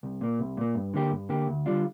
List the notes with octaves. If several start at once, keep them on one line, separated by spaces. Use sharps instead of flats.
C2
A#2 A#3
C2
A#2 A#3
G2
D3 A#3 G4
G2
D3 A#3 G4
D2
D3 G3 D4 F4